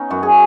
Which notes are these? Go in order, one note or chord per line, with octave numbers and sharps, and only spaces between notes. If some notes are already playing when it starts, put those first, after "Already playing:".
Already playing: B3 C#4 D#4
F#2 F#4
G#4